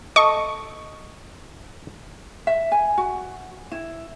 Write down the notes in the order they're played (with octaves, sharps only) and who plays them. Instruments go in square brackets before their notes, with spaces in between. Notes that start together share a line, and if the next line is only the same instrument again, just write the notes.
[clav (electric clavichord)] A4 D#5 [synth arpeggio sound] C#6
[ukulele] E5
G#5
F#4
E4